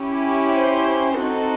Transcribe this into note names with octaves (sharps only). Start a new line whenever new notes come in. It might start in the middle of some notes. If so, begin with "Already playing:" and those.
Already playing: C#4 E4 G4
C5
C4 D#4 F#4 A4